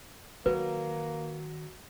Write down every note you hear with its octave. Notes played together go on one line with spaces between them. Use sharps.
D#3 F#3 A#3 B4